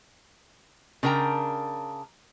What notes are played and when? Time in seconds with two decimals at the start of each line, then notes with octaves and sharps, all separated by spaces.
1.03 C#3 D4 A#4 G5 A#5